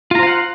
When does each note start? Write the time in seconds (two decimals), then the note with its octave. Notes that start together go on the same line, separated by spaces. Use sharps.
0.11 F4
0.15 A#5
0.19 C5
0.23 F5
0.27 F#5